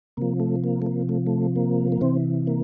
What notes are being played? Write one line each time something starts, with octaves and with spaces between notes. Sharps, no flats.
C3 F3 A#3
A3
A#3
A3
A#3
A3
A3
A#3
A#3
C3 E3 C4
A#3